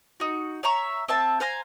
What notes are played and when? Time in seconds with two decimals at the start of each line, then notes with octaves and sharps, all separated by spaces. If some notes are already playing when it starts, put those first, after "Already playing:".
0.20 D#4 F#4
0.63 C#5 E5 A#5 C#6
1.08 C4 E5 A5
1.40 C5 F5 G#5 A#5